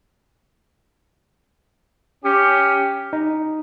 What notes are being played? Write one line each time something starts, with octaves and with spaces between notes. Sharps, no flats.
C#4 G4
D#4